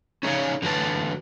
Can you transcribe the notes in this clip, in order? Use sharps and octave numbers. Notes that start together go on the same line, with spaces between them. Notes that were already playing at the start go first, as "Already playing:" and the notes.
C#4 D#4 G#4 C#5 F5
D3 E3 F#4 B4 A5